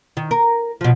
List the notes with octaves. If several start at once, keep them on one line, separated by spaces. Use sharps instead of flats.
D#3
A#4
B2 F3